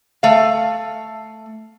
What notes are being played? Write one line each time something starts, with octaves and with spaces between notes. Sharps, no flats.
A3 F5